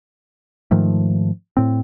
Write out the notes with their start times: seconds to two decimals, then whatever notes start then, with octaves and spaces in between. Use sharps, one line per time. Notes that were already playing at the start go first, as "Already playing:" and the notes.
0.71 G#2 D#3 F3 A3
1.57 A2 C4